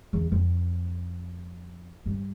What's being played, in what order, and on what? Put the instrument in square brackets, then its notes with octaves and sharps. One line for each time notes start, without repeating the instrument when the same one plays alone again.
[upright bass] E2
F2
G2